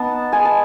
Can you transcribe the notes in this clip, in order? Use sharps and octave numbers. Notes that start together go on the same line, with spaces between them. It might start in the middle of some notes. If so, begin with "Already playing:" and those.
Already playing: B3 D#4 A5 B5
G#3 G#5
A5